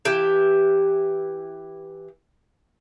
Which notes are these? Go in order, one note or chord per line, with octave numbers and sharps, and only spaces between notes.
E3 G4 A5